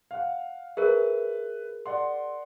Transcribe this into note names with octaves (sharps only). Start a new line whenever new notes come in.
F5 F#5
G#4 A#4 B4 E5
D5 F#5 C6